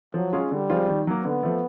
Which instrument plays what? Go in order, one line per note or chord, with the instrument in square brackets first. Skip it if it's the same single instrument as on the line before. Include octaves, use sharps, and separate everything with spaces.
[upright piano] F3 [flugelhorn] F#3
[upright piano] G#3 C#4 F4 G#4
[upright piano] D3 [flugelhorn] G3
[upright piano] F3 G#3 C4 F4
D#3
F#3 A#3
[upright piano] D3 [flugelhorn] B3
[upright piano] F3 A3